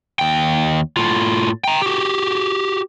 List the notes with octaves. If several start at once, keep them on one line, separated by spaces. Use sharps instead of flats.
D#2 G5
A2 F4
G5 A#5
F#4 G4